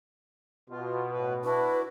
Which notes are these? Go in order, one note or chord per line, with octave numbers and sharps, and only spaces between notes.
B2 F4
A2 B4
D4 E4 F#4 B4